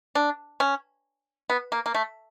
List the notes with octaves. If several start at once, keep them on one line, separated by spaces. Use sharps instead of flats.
D4
C#4
B3
A#3
A#3
A3